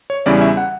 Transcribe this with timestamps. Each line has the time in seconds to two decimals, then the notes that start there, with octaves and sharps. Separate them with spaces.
0.10 C#5
0.26 E2 C#3 G3 C#4 E4 D5
0.41 E5
0.57 F#5